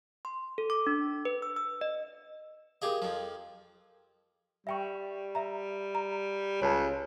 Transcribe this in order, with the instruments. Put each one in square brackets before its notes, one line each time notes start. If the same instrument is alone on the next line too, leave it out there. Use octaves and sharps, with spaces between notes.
[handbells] C6
A4
D6
D4
B4
E6
E6
D#5
[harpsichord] G4 G#4 D#5 [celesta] A#4 F5
[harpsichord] F2 F3
[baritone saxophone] G3 [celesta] E5 G5 C#6
[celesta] E5 A#5
A#5
[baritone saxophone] C#2 [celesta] C#5 A5